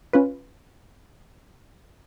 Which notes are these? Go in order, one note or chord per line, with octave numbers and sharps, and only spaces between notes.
C#4 F4 B4